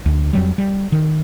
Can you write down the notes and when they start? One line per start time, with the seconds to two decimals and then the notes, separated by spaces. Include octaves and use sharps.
0.06 D2
0.33 F2 F#3 G3
0.58 G3
0.92 D#3